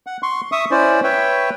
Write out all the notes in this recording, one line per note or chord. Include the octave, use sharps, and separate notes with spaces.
F#5
C6 C#6
E5 C#6 D#6
C#4 E4 C5 D5
B4 C#5 E5 G5